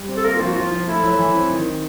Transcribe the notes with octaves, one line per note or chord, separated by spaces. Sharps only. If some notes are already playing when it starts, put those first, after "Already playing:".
Already playing: G3
C4
A4
A#3 A#4
F4
F3
F#4
F3 F4
F3
A3 E4
F#3
E3
C4
D#3